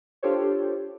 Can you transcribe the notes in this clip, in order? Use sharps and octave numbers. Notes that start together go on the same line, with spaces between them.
D4 F4 G4 A4 C5 C#5